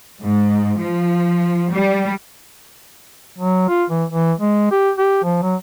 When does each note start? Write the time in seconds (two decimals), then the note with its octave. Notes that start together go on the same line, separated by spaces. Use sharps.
0.21 G#2
0.80 F3
1.72 G3
3.38 F#3
3.69 F4
3.90 E3
4.10 E3
4.41 G#3
4.71 G4
4.98 G4
5.24 F3
5.42 F#3